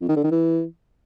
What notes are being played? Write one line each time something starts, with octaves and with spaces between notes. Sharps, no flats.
F2
D#3
D3
D#3
E3